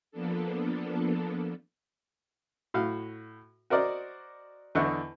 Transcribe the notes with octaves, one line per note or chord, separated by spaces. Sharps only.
F3 A#3 B3 D4 A4
A2 F#4 F5
F#4 A#4 C5 D5 D#5
E2 D3 E4 D#5 C#6 F#6